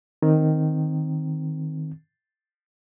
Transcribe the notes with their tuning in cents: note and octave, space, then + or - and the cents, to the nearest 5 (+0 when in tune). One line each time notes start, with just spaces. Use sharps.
D#3 +0 C4 +0